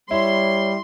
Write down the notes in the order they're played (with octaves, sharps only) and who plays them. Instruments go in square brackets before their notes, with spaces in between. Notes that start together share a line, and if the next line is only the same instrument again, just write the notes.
[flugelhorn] G3 [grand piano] E4 [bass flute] C#5 [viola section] C6